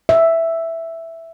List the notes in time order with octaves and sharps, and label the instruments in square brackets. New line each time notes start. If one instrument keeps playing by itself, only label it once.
[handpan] E5